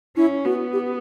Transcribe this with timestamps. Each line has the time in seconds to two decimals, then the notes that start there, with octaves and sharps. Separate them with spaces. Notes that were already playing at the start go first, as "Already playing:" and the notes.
0.16 C#4 E4
0.44 B3 F#4
0.73 G4